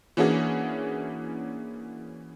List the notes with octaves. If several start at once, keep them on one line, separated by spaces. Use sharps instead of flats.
E3 A#3 C#4 D4 F#4 G#4